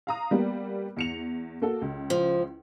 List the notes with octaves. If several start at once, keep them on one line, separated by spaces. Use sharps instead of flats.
F5 A#5 D#6
G3 A#3 B3
E2 C#7 F7
A#3 F#4 A4
C#2
F3